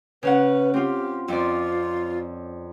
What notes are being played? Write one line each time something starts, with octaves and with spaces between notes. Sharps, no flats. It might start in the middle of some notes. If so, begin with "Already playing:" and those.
C#3 C#4 B4 F#5
C4 F4 G4
F2 F4 D5